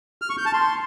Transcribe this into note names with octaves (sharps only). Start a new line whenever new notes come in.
F6
C#6
G6
A5
C6